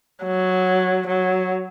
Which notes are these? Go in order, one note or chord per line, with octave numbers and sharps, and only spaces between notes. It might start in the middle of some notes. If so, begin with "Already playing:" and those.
F#3
F#3